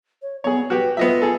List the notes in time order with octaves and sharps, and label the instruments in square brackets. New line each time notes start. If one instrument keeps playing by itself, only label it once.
[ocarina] C#5
[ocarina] B3 [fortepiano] G#4 C#5
[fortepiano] F#4 G4 [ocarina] B4
[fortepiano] B3 D#5 E5 [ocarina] F4
[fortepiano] G#4 A4